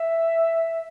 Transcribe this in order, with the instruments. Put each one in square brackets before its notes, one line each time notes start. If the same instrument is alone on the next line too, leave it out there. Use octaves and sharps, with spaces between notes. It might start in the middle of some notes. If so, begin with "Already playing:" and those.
Already playing: [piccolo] E5